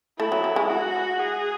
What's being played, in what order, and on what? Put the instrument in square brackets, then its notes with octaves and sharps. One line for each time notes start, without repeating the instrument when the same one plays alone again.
[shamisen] A3 [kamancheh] E4
[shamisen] F#3
F#3
G#3
[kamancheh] F#4
G#4